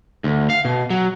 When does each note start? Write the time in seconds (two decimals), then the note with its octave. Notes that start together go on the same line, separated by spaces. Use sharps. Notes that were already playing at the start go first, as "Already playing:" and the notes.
0.24 D2
0.50 F5
0.65 B2
0.90 F#3